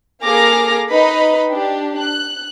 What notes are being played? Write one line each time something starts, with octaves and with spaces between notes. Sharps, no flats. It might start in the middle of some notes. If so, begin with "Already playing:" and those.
A#3 G#4 A4 D6 F6 A#6
D#4 B4 D#5 B5
D4 G4
F#6